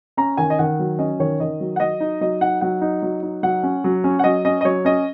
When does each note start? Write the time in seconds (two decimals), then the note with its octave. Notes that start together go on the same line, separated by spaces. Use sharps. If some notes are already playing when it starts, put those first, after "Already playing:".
0.17 C#4 A#5
0.37 D#3 G#5
0.50 D#5
0.59 D#3 F#5
0.79 F#3
0.98 C#4 D#5
1.19 D#3 C#5
1.40 D#3 D#5
1.60 F#3
1.76 F#5
1.80 F#3 D#5
2.00 D#4
2.21 F#3 D#5
2.41 D#4 F#5
2.61 F#3 F#5
2.81 D#4
3.03 F#3
3.23 D#4
3.43 F#3 F#5
3.63 C#4
3.84 F#3
4.04 C#4
4.19 F#5
4.24 F#3 D#5
4.45 C#4 D#5
4.61 D#5
4.65 F#3 C#5
4.85 C#4 D#5